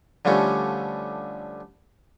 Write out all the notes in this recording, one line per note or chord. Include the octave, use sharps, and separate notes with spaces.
D3 F3 G3 A3 C#4